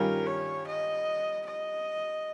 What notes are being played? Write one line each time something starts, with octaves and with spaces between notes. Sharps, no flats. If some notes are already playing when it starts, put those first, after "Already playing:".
Already playing: G2 D#3 G3 C#4 F4 A#4
C#5
D#5
D#5